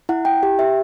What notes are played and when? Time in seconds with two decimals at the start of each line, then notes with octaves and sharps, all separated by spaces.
0.09 E4 F#5
0.25 E4 G5
0.43 G4 G5
0.59 G4 E5